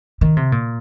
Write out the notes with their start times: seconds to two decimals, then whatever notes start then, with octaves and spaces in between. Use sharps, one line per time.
0.21 D#3
0.37 C3
0.52 A#2